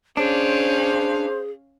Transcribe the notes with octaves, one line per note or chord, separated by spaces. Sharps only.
C#4 D4 G#4 C5 F5